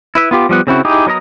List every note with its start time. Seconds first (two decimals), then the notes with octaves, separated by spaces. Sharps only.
0.15 E4 B4 E5
0.31 B3 F4 G4
0.49 F3 G3 B3 F#5
0.67 C#3 C4 E4 F#4
0.85 D#4 E4 G4 G#4
1.07 F#3 B3 A#4 D#5 A#5